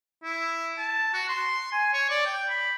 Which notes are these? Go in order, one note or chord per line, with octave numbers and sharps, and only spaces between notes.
E4
A5
F#4
C6
G#5
C#5
D5
G5
B5